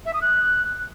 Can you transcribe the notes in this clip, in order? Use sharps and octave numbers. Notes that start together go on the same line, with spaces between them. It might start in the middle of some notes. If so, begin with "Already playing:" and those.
E5
D#6
F#6